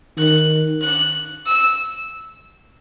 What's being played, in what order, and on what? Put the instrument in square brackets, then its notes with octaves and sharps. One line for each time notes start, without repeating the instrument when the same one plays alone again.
[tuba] D#3 [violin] F#6
[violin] F#6
E6